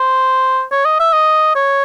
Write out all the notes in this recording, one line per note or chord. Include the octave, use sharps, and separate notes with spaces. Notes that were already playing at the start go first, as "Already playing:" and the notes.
Already playing: C5
C#5
D#5
E5
D#5
C#5